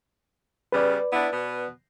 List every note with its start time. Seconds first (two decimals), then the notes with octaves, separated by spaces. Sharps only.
0.72 C#3 G3 B3 B4 D5
1.12 B3 D4 E4
1.33 B2 B3